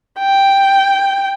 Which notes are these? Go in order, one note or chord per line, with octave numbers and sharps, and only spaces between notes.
G5